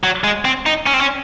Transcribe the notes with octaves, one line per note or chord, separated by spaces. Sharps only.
F#3
G#3
C4
D#4
C#4
C4
C#4